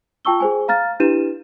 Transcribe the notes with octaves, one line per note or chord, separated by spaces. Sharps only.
F4 G5 A5 C#6 E6 G7
G#4 C5 G#5
F5 A#5 F6 A6
D4 E4 G4 B4 D#7 E7